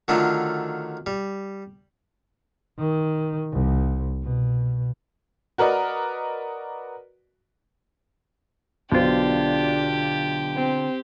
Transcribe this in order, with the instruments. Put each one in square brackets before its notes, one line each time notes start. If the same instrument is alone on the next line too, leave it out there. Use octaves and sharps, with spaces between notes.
[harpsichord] D3 D#3 F#3 A3 D4 F4
G3
[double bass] D#3
C2
B2
[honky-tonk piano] F#4 A#4 B4 D5 D#5
[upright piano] B1 B2 C5 [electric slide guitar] D3 F4 [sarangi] D4 [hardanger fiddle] G4
[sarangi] C4